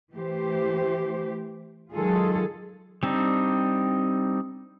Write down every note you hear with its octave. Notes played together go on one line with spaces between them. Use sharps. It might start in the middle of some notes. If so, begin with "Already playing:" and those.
E3 A3 G4 C5
D#3 F#3 G#3 F4 G#4 A4
G3 C4 D4 D#4